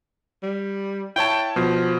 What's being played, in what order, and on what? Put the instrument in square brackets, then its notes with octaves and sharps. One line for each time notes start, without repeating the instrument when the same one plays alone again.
[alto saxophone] G3
[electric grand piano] E4 C#5 A5 [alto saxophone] G5
[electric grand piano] B2 [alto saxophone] F3